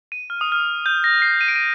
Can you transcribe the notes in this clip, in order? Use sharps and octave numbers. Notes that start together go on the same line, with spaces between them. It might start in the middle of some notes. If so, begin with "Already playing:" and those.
D#7
F6
D#6
F6
G6
A#6
C7
D#7
D7
D#7